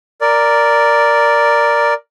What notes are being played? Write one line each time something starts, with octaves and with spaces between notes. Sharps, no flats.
A#4 D5